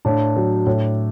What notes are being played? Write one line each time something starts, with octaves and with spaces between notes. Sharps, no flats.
A2 D4
F#3
A2